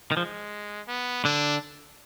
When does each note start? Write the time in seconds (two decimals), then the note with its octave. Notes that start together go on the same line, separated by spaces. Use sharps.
0.12 D#3
0.16 F3 G#3
0.88 B3
1.25 D3 D4